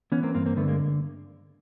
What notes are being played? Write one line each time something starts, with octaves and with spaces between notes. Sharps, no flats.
E3 B3 C#4
A#3 C4
G2 A#3 C4
A#3 C4
D3 A3 B3
G#3 A#3